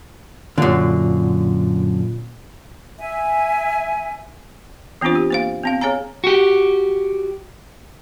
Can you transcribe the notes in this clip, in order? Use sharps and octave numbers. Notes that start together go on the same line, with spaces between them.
F#2 A#2 D3
E5 G#5
E3 B3 C4 D4 F4 C5
G4
A#3 C5 F5
B3 C4 F5
G#4 C#5 F5 G#5 A#5
F#4 G4